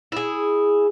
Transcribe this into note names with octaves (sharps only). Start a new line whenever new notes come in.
E4 G#4